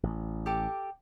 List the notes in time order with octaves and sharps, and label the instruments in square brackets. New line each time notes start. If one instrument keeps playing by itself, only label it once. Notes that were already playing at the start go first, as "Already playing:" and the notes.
[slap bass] A1
[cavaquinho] G4 A4 D6